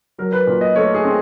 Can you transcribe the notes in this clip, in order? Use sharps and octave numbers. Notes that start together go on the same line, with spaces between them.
F#3 A#4
B4
A#2
D#5
A3 C#5
G#4
C4